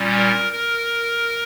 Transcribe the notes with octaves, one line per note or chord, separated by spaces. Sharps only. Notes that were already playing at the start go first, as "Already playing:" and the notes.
Already playing: A#2 G3 C#4
A#4
A#4